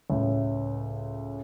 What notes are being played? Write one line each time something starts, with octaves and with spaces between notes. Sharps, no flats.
C#2 A2